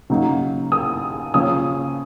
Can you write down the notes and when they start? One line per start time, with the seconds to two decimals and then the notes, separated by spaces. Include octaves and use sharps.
0.10 C#3 F#3 A#3 D#4
0.72 D#6
1.34 C#3 F3 A#3 C#4 D#6